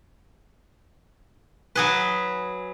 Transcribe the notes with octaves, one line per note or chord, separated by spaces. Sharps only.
F#3 G#4 B4